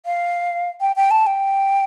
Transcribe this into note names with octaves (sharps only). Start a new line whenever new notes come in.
F5
G5
G5
A5
G5